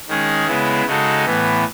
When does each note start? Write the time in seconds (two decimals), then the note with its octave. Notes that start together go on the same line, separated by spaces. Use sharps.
0.08 D#3 G#3 C#4 G#4
0.47 C#3 G#3 B3 E4
0.86 C#3 G#3 D#4 F#4 A4
1.26 A2 E3 B3